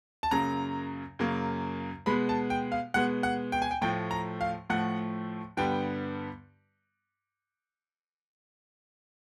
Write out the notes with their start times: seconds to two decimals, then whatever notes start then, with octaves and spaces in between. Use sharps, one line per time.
0.23 A5
0.31 F#2 C#3 F#3 A#3 A#5
1.19 F#2 C#3 F#3 A#3
2.06 B2 G#3 B3 B5
2.29 A5
2.50 G5
2.72 F5
2.94 B2 G#3 B3 F#5
3.23 F#5
3.52 G5
3.62 G#5
3.71 G5
3.82 A2 F3 A3 G5
4.11 A#5
4.41 F5
4.70 A2 F3 A3 F#5
5.57 G2 D3 G3 B3 G5